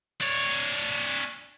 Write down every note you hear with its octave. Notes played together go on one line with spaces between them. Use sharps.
D4 C#5